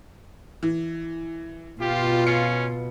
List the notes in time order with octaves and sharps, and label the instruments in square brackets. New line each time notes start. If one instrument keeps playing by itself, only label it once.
[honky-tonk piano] E3
[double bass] B2 [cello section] F4 [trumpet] G4
[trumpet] C#4 [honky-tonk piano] C#7